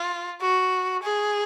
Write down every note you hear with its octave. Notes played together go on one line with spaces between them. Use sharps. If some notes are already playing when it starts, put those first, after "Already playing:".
Already playing: F4
F#4
G#4